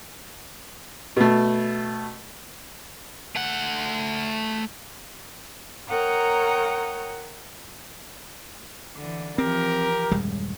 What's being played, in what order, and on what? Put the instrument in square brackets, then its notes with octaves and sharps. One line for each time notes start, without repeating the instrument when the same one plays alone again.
[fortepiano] B2 A3
[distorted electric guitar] A3 F#5
[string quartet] A#4 C#5 F#5 G5 A#5 D#6
[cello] D3 E3
[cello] E3 F3 [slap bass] C4 [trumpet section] G4 A#4
[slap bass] D#1 G3 G#3 [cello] F#2